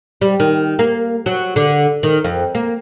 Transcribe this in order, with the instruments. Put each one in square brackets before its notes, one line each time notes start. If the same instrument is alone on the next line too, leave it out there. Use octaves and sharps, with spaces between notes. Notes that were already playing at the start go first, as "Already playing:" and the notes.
[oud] G3
D#3
A#3
F#3
D3
D#3
F2
A#3